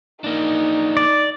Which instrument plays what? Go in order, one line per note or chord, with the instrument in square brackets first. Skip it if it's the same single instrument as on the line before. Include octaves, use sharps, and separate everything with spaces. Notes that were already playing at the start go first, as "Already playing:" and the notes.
[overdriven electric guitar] A#3 D4 [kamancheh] D#4
[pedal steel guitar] D5